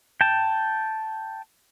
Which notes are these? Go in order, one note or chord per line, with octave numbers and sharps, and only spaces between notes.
G5 A5